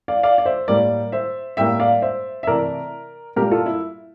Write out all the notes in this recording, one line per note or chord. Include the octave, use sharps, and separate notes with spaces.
D5 F5
D5 F5
D5
C5 E5
A2 G3 A#3 A#4 D5
C5 E5
A2 G3 A#3 E5 G5
D5 F5
C5 E5
E5
C3 E3 A3 A#4 D5
A#2 G3 A#3 G4 A#4
F4 A4
E4